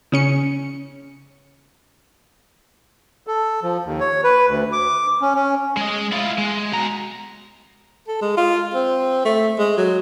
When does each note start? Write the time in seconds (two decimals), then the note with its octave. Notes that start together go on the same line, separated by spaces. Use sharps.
0.12 C#3 C#4 C#7
3.27 A4
3.63 F3
3.85 D#2
4.00 C#5
4.24 B4
4.47 D2
4.72 D6
5.21 C#4
5.35 C#4
5.77 G#3 D#5
6.12 E4 F4
6.38 G#3
6.72 B2 A#5
8.08 A4
8.21 G#3
8.37 F4
8.74 C4
9.25 A3
9.58 G#3
9.77 F#3